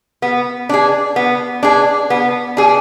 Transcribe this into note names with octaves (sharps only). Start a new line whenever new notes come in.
B3
D4 G#4
B3
D4 G#4
B3
D4 G#4